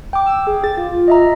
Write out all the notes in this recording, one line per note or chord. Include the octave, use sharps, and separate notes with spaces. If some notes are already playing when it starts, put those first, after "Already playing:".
G5 D6
E6
G#4
A6
F4
D#5 E5 A#5